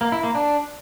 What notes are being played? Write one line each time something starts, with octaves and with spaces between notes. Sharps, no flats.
A#3
E4
A#3
D4